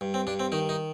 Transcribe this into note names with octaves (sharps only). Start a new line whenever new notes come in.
G2
C4
G2 D4
C4
D#3 D#4
D#4